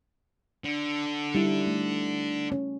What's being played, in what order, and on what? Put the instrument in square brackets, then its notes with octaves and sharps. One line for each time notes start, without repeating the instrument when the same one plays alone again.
[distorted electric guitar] D3
[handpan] G3 D#4 E4
A3
C#4